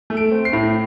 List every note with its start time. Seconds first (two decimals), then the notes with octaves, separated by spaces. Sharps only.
0.10 A3
0.17 D7
0.32 C4
0.45 C7
0.53 A2